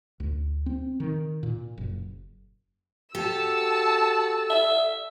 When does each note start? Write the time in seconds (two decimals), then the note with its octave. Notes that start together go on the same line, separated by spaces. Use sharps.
0.20 D2
0.66 C4
1.00 D#3
1.43 A#2
1.78 F#1
3.15 F#4 G4 A4 A5 E6
4.50 E5